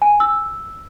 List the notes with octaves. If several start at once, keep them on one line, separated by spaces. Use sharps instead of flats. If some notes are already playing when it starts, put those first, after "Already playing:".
G#5
E6